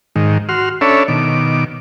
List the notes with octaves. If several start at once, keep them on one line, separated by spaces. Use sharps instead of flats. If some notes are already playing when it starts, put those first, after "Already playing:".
G#2 D#3
F#4 C6 F6
C#4 D4 A4 C#5 E5 B5
B2 D#3 D6